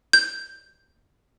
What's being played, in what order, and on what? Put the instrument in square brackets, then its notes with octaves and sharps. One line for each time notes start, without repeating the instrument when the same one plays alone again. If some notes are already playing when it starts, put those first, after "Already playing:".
[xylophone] G6